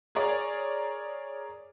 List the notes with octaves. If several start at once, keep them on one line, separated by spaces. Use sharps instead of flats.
G#4 A#4 C#5 D5